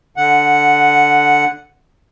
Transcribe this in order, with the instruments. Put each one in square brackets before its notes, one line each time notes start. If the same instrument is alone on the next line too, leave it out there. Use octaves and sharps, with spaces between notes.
[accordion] D3 F#5